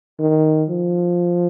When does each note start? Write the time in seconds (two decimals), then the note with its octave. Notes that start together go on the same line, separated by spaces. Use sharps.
0.20 D#3
0.69 F3